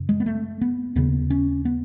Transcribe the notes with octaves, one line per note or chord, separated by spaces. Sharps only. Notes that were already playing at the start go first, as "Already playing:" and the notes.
Already playing: F#2 C#3
G#3
B3
A3
B3
D#2 C#3 B3
C#4
B3